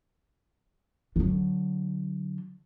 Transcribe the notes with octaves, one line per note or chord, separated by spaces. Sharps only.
D3 F#3